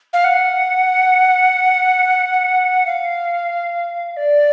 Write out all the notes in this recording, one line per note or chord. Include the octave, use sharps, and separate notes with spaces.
F5
F#5
F5
D5